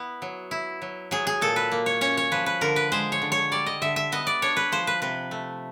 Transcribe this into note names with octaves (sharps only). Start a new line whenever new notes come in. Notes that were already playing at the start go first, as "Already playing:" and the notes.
Already playing: B3 E4
F#3
E4
F#3
F#3 G#4
G#4
A#2 A4
B4
A#3
C#5
C#4 C#5
C#5
F3 B4
B4
D3 A#4
B4
G#3 C5
C#5
D3
C#5
G3 D5
D#5
D3 E5
E5
B3 D#5
D5
D4 C#5
B4
F3 C5
B4
C3 B4
A3